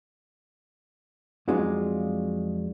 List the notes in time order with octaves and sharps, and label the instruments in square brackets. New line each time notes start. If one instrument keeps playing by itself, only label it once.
[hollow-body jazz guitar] F2 F#3 G#3 D4 D#4 F4